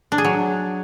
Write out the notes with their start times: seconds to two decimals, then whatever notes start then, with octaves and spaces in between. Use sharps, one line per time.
0.12 D4
0.18 G#4
0.25 F#3